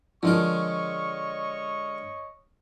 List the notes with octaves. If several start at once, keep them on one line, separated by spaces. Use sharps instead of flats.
D3 F3 G#3 A#4 C#5 D#5 C#6